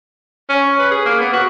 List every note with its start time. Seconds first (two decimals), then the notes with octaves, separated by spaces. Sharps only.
0.49 C#4
0.79 B4
0.91 G#4
1.06 A#3
1.20 B3
1.33 F#4